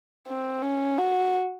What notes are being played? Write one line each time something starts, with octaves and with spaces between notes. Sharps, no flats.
C4
C#4
F#4